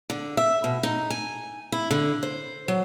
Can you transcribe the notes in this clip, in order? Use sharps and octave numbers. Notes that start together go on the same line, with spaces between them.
D3
E5
B2
D#4
G#5
E4
D3
C5
F#3